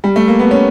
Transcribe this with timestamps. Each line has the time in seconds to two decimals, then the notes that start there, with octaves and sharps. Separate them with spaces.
0.04 G3
0.16 A3
0.28 A#3
0.39 B3
0.51 C#4